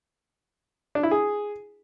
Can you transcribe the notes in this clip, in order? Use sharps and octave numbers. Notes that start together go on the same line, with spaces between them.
D4
E4
G#4